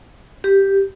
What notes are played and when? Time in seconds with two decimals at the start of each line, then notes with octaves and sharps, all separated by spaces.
0.44 G4